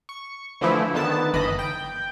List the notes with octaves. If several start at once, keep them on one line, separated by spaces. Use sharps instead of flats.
C#6
D3 E3 F3 A3 E4
D3 D#3 B3 A5
G1 E3 D#5 B5
G5